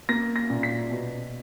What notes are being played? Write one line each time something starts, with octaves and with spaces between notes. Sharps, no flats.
A#3 A#6
A#6
A#2
B6
B2